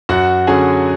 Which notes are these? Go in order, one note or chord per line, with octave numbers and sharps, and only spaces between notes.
F#2 F#4 F#5
D3 F#3 C#4 G#4 G#5